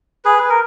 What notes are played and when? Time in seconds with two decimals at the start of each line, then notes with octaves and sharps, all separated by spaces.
0.25 G#4 B4
0.39 B4
0.49 A#4